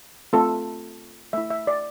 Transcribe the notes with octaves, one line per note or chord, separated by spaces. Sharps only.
A3 C4 F4 A4
A3 E4 E5
E5
D5